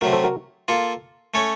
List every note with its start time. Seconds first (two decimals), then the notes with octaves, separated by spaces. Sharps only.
0.01 C3 F#3 A3 F#4 A#4
0.13 A4 C5
0.24 F#4 A#4
0.68 A#3 F4 A4
1.34 A3 C#4 A4 C#5